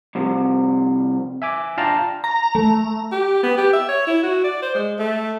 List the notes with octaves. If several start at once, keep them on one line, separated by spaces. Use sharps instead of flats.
C2 C3 F3
E5 G#5 D6
D4 F4 F5 G5 A5 A#5
A#5
A3
G4
B3
G4
E5
C#5
E4
F#4
D5
C5
G#3
A3